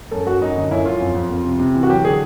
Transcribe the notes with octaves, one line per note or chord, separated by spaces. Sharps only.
F#2 A4
F#2 F#4
F#2 D#4
D3 D#4
F#2 E4
F#2 F4
F2
F2
F2
C3
C3
E3
F#4
F#3 G4
D3 G#4